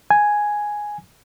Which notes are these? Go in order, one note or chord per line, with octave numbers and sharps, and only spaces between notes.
G#5